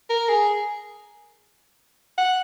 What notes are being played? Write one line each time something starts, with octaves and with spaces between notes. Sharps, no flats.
A#4
G#4
F#5